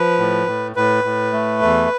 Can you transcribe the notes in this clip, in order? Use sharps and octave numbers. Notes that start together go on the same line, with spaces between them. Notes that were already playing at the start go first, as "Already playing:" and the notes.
Already playing: F3 B4
A2
A2
A2 B4
A2
A3
E2